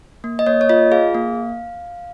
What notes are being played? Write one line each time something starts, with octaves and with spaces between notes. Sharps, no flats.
A#3
D#5
A#3 C#5
C#5
F4 D#5
G#4 F5
A#3